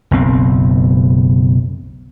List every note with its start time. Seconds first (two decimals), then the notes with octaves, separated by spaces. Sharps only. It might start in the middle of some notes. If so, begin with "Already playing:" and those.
0.11 F#1 B1 C4